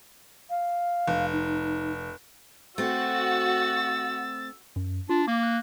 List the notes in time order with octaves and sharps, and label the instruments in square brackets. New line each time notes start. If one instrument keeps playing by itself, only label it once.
[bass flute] F5
[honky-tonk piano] F1
[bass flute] D#4
[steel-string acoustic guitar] A3 C4 [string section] F#4 [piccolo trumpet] E6 [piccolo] A6
[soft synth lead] F#2
[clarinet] D4 [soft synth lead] F4
[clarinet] A#3 [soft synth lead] D6
[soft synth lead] F#6